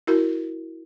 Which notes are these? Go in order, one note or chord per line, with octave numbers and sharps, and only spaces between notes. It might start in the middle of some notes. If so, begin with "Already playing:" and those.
E4 F#4 A#4